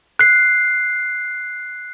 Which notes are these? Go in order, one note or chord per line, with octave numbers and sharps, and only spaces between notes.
F#6 C7